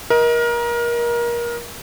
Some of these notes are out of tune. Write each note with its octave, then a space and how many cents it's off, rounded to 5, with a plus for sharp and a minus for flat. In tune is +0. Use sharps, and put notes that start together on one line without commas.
A#4 +25 D#5 +30